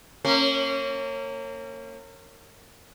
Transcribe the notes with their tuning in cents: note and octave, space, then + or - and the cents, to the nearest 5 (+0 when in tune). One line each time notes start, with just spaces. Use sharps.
A#3 -30 C#4 -20